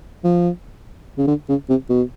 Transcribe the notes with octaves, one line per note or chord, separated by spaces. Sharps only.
F3
C#3
D3
C#3
C3
B2